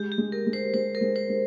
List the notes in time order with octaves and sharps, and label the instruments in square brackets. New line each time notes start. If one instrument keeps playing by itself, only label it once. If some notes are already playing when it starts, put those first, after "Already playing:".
Already playing: [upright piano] G#3 [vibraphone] G4
[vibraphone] G4
[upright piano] G#3
[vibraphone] A#4
[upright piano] G#3
[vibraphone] C5
[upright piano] G#3 [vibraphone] C5
[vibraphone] A#4
[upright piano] G#3
[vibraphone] C5
[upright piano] G#3